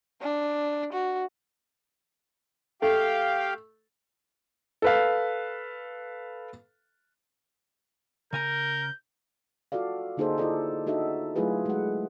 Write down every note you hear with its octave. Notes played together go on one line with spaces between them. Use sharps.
D4
F#4
A3 G4 F5 G5
A4 B4 F5
C#3 A#4 G#5 A#5 G6
F4 F#4 A4 D5 F5
D3 A#3 D#4 G#4 A4 C5
E4 F4 G#4 A4 D5 D#5
D4 D#4 F#4 A4 D#5 E5
F#3 A3 E4 F4 G#4 B4
G#3 F#5